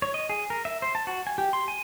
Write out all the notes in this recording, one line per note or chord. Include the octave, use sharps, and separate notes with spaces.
C#5
D#5
G#4
A#4
E5
C5
A5
F#4
G#5
G4
C6
G#5